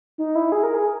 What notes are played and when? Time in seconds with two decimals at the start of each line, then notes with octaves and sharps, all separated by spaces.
0.18 D#4
0.35 E4
0.52 G#4
0.63 A#4
0.74 G#4